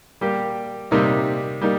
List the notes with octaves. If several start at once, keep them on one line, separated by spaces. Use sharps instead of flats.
G3 A#3 G4
C3 G3 A#3 D#4
G3 A#3 D#4